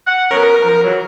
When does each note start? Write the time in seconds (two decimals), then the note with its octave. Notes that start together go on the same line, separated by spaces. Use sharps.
0.06 F#5
0.31 F#3 B3 C#4 A#4
0.63 F3
0.84 C#3 E3 F#3